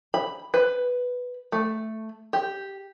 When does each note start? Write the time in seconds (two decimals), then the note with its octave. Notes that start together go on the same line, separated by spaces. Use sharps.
0.14 B5
0.54 B4
1.52 A3
2.33 G4